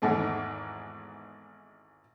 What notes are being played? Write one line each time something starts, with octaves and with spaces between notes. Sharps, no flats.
G#1 E2 G#2 A3